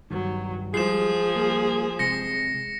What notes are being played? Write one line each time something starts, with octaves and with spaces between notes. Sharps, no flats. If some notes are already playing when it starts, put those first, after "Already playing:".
G2 D#3 F#3
F3 G3 G#3 G#4 C7 E7
G3 A#3
C3 G#3 A#6 C#7